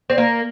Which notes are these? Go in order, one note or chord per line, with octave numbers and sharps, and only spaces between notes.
C4
A#3